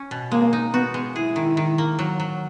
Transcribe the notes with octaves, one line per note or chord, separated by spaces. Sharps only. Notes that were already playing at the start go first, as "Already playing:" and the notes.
Already playing: C#4
B2
G#3 A#3
D#4
B3 F#4
G#3
E4 G#4
D#3
D#3
A#3
F#3
F#3